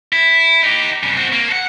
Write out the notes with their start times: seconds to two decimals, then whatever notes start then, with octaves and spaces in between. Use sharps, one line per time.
0.13 E4
0.63 D#4 G4
1.03 G2 C#3
1.17 C4 F#4
1.32 A#3
1.48 A4 F#5